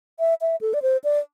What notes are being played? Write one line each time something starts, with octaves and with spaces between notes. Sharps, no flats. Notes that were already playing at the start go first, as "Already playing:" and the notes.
E5
E5
A4
D5
C5
D5